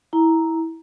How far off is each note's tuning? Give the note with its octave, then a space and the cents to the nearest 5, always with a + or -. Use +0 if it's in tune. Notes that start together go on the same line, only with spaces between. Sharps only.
E4 -15 A#5 +0